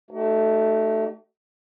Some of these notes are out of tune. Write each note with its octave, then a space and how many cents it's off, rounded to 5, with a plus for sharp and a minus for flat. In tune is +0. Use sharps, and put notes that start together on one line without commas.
A3 +0 D#4 -25 F#4 +45